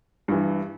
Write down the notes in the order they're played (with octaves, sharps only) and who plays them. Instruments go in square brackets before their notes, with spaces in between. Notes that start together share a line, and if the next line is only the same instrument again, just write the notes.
[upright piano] G2 E3